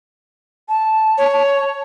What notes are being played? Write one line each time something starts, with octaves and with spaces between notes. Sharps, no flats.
A5
C#5